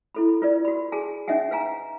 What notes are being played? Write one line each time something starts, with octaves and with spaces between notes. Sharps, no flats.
E4 A4 B5
F4 B4 D5
F#4 B5
F#4 G#4 G#5 A5
C#4 D#4 D#5 E5 F#5 G#5
B4 F5 G#5 A#5